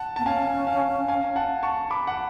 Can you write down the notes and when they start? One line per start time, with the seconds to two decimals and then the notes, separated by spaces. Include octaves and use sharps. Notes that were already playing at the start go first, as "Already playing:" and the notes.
Already playing: F#5 A5
0.16 B3 A5
0.25 C#4 F5 G#5
0.67 F5
1.08 F5 G#5
1.36 F#5 A5
1.63 A5 C#6
1.91 B5 D6
2.07 F#5